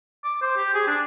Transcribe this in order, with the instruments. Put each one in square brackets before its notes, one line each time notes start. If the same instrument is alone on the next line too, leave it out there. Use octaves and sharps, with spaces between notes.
[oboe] D6
C5
G4
G#4
D4